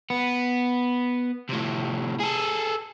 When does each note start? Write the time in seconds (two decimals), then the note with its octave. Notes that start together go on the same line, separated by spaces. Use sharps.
0.10 B3
1.50 A2 C3
2.20 G#4 A4